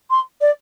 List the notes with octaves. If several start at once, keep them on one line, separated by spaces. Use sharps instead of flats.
C6
D5